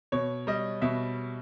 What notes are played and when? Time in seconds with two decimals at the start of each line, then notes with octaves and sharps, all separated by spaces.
0.12 B2 C#5
0.47 G3 D#5
0.82 B2 E5